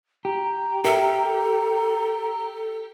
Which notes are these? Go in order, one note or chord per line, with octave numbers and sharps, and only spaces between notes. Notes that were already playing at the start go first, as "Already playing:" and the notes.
G4 A#5
G4 A4 A#4 E5